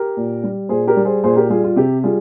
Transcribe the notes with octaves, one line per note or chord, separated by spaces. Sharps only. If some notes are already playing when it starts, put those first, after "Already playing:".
Already playing: G4 A#4
A#2
G3
A#2 G#4 C5
G4 A#4
G3
G#4 C5
A#2 G#4 C5
G4 A#4
G3 F4 G#4
F4
C3 G4
G3 F4 G#4